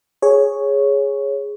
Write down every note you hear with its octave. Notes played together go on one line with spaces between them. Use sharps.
G#4 C#5